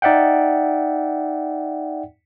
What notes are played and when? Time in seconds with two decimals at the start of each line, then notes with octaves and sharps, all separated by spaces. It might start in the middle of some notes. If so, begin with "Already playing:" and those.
0.02 D#4 D5 E5 F#5 G5